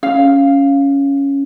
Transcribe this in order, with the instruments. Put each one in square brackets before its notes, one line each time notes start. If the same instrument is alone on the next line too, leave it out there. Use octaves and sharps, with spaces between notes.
[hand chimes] C#4 [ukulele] F5